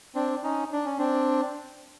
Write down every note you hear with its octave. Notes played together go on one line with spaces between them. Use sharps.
C4 D4
C#4 D#4
D4
C#4
C4 D4